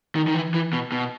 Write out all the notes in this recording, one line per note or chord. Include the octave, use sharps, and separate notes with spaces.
D#3
D#3
E3
E3
B2
B2